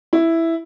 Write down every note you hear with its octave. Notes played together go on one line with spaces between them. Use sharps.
E4